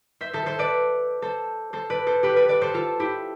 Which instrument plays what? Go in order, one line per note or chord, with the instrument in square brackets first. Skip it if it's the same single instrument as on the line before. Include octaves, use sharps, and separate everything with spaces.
[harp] C5 E5
A4 C5
A4 C5
B4 D5
A4 C5
A4 C5
B4 D5
A4 C5
G4 B4
B4 D5
B4 D5
A4 C5
F4 A4
E4 G4